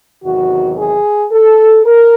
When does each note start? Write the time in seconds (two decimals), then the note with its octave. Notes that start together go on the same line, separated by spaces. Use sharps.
0.23 E2 C3 D#3 F#3 F#4
0.77 G#4
1.32 A4
1.85 A#4